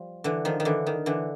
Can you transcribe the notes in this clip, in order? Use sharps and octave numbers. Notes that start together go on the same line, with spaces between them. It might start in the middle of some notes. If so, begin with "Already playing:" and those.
Already playing: F3 G3
D3 E3
D#3 F3
D#3
D3 E3
D#3
D3 E3